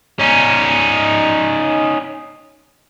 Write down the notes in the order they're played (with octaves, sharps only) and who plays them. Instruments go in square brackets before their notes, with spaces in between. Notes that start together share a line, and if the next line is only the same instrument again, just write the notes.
[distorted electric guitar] C#4 D#4